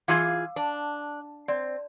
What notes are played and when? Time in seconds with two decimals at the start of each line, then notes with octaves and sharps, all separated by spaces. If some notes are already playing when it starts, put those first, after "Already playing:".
0.08 E3 F4 G#4 F5 D6 E6
0.56 D4 A5
1.48 C4 D5